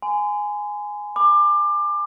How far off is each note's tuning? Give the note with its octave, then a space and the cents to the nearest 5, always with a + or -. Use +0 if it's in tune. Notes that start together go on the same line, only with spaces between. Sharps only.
G#5 +0 C6 -40
B5 +25 D6 +25